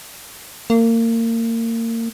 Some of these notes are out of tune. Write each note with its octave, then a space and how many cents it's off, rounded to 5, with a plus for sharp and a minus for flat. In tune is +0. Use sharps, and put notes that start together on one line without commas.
A#3 -30